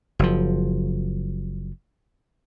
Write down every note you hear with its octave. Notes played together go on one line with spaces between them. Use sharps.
F#1 F3